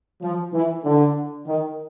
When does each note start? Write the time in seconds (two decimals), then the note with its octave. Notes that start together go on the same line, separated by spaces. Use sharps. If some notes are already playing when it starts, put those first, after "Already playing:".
0.21 F3
0.53 E3
0.84 D3
1.47 D#3